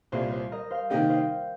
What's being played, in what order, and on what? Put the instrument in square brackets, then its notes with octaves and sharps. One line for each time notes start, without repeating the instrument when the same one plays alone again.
[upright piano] C2 A#2 G3 A#3 [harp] C5
[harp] C5
A#4 D#5
C5 F5
[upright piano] C3 D#3 A#3 D#4 G4 [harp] D#5 G5
[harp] C5 F5